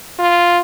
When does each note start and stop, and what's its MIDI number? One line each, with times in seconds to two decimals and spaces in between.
0.19 0.61 65